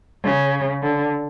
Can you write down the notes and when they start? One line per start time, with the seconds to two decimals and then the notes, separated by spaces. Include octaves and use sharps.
0.24 C#3
0.82 D3